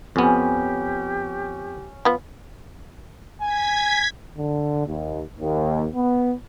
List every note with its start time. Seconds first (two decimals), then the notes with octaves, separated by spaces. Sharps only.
0.16 F2 B3 C#4 G4
2.05 F3 B3
3.41 G#5 G#6 B6
4.37 D3
4.87 D#2
5.39 D#2
5.95 B3